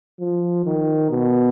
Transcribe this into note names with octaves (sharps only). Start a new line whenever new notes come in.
F3
D#3
B2